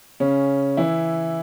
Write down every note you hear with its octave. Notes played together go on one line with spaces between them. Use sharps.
C#3 C#4
E3 E4